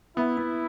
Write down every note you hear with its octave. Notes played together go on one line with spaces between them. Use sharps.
B3 E4
B3